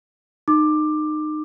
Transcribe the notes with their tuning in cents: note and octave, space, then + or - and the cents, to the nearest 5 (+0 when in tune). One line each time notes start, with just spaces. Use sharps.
D#4 -25 D6 +15